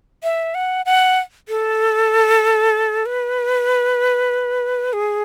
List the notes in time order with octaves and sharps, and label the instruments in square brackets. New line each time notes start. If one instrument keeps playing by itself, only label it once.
[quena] E5
F#5
F#5
A4
B4
G#4